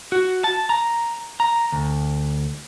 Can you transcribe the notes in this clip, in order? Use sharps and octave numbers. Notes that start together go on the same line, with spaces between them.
F#4
A5
A#5
A#5
D2